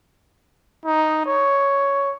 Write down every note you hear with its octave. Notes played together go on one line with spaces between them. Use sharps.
D#4
C#5